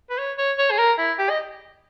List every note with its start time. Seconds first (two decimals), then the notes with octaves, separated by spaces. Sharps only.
0.10 B4
0.18 C#5
0.38 C#5
0.58 C#5
0.71 G#4
0.78 A#4
0.98 E4
1.18 G4
1.29 D#5